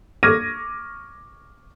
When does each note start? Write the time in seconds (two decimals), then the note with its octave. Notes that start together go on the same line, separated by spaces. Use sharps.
0.23 C#6 D6 F6 G#6 A#6 D#7